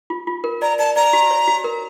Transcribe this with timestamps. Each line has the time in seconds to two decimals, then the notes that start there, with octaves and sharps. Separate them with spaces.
0.10 F4
0.27 F4
0.44 A#4
0.62 D5 A#5
0.79 D5 A5
0.96 D5 A#5
1.13 F#4
1.31 C#5
1.48 F#4
1.64 A#4